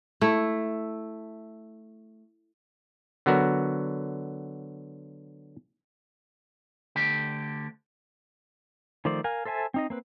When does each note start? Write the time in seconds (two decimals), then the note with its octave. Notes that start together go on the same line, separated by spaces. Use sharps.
0.21 A3 E4
3.26 D3 F#3 B3 F#4 A#4
6.96 D2 D3 G4
9.05 D#3 F3 A3 C5 D5
9.24 A#4 F5 G#5
9.45 A4 C5 E5 G#5 A5
9.74 C4 D#4 D#5
9.90 A#3 C4 B4